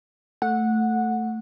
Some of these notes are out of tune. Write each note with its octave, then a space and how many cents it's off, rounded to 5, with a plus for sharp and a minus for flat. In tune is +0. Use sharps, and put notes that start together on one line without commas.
A3 +5 F#5 -15